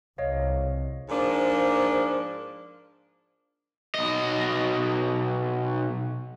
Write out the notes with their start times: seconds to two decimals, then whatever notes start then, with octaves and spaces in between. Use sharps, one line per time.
0.18 C2 C#5 D#5 F5
1.09 G#2 F3 A#3 D4
3.95 B1 D#5